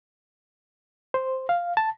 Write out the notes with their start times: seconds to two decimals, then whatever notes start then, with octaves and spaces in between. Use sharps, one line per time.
1.14 C5
1.49 F5
1.77 A5